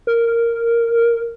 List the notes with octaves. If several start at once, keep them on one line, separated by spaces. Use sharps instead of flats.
A#4